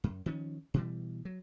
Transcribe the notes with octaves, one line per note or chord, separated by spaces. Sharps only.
F#2
D#3 F3 C#4
B2 E3 G3
F#3